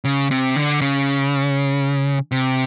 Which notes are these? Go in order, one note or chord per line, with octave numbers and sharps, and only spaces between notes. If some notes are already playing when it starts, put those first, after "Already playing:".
C#3
C3
D3
C#3
C3